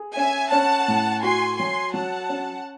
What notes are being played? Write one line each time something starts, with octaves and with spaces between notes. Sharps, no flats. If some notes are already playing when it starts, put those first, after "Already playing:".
Already playing: G#4
C#4 E5 G#5
C#4 F#5 A5
A2
F#4 G#5 C6
F#3 G#5 C6
F#3 F#5 A5
C#4